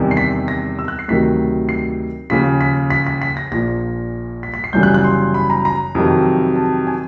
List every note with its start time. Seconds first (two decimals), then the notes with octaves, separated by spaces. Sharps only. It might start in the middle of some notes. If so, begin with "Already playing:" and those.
Already playing: E2 C3 D#3 G3
0.11 C7
0.17 B6
0.48 A#6
0.79 E6
0.88 F#6
0.99 C7
1.08 D2 C3 D#3 F#3 B6
1.69 C7
2.30 D#2 C#3 F3 B6
2.61 B6
2.90 B6
3.07 B6
3.22 B6
3.37 A#6
3.52 A#1 A#2 F3 A#6
4.43 B6
4.54 B6
4.64 C7
4.73 G1 F#2 C#3 E3 G3 G6
4.83 F#6
4.94 F#6
5.04 C6
5.34 B5
5.50 A#5
5.65 A#5
5.95 F2 C3 D#3 F#3
6.56 A5
6.87 G#5